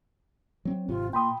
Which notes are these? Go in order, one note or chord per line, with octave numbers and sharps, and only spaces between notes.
F#3 C4
G#1 C3 F4
A#2 G5 B5 C6 D#6